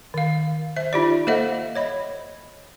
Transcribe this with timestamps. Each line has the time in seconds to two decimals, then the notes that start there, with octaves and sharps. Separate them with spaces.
0.14 D#3 F5
0.76 C5 E5
0.93 D#4 F4 G4 D5
1.27 A#3 A4 C5 D#5 E5 F#5
1.75 C#5 D#5 B5